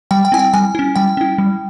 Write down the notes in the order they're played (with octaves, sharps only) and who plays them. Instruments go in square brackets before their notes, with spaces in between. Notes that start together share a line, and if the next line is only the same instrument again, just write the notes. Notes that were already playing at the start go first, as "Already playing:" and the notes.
[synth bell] G3 G5
G5
C4 E4 G#5
G5
G3 G#5
C#4 E4
G3 G5
C#4 E4
G3